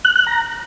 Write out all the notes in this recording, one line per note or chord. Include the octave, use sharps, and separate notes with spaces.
F#6
F#6
A#5